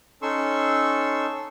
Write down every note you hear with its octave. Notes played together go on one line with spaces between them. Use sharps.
C#4 D#4 A4 C6 C#6 E6